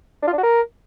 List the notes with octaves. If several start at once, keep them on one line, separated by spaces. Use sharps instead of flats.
D4
F4
D4
F#4
A#4